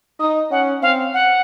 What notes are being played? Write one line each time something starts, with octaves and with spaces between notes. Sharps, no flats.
D#4 D#6
C#4 F#5
C4 F5
F#5